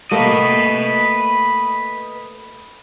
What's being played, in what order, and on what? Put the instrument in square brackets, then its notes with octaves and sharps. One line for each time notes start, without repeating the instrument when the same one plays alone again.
[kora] A3 A#3 [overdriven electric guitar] B4 D#5